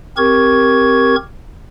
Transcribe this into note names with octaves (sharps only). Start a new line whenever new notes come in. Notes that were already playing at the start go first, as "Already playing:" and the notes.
C4 G4 A#4 C#6 G#6